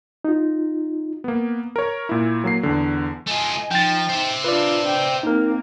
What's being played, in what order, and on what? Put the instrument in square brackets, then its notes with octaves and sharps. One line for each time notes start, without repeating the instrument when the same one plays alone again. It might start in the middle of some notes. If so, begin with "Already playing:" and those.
[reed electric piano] D#4 F4
[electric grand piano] A#3 B3
A#4 C#5
A#2 E4
F#3 A#3 C7
E2 D3
[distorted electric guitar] A3 F4 [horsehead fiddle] D#5 G#5
[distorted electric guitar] F3 [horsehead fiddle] D#4 [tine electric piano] G5 A6
[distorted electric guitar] C5 E5
[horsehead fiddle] D4 F4 [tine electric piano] B4 D5
[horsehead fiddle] G5
[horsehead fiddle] A#3 C4 [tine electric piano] D#4 A#4